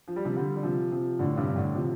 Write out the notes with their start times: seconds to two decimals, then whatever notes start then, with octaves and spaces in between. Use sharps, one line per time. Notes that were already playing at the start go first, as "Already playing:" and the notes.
0.08 F3
0.16 G3
0.25 C3 F3
0.36 D3 G3
0.56 G3
0.63 C3 F3
0.91 C3 F3
1.19 A2 D3
1.37 G2 C3
1.56 A2 D3
1.74 C3 F3